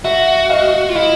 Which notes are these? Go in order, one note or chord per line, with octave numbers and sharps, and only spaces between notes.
F#4 E5 F#5
D#5 F5
F4
E4 D#5 F5